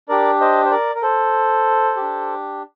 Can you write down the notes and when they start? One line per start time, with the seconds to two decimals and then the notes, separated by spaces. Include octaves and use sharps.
0.09 D4 G4 A#4 D5
0.40 C5 D#5
0.65 C5
0.71 A#4 D5
0.95 A#4
1.02 A4 C5
1.96 G4
2.01 D4